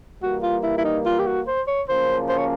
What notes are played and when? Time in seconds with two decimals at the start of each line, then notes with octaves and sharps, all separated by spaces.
0.22 E3 G3 A#3 F#4
0.42 F4
0.63 E4
0.78 E4
0.84 D#4
1.05 F4
1.19 G4
1.26 F#4
1.47 C5
1.67 C#5
1.88 F#2 C#3 F3 A#3 C#4 C5
2.29 C5
2.38 C#5